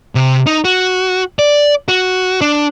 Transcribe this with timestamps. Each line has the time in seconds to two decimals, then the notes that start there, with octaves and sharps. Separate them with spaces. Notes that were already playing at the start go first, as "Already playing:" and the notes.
0.15 C3
0.47 D#4
0.65 F#4
1.39 D5
1.88 F#4
2.41 D4